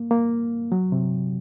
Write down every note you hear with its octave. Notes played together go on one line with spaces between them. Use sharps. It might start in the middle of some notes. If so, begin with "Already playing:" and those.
Already playing: A#3
A#3
F#3
C3